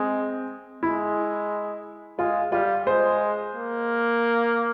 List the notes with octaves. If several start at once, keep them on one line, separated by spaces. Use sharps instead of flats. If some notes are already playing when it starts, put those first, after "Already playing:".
Already playing: G#3 C4
G#3 E4
G#3 F4
G3 F4
G#3 C5
A#3